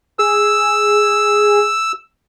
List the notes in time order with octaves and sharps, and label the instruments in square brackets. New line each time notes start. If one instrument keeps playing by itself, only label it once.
[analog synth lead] G#4 [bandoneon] E6